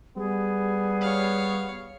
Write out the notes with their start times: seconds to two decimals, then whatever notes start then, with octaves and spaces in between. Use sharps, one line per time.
0.17 G3 B3 G#4
1.01 C#5 F5